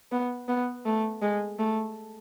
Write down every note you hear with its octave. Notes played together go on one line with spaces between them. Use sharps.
B3
B3
A3
G#3
A3